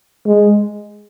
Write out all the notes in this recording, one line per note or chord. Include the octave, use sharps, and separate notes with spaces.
G#3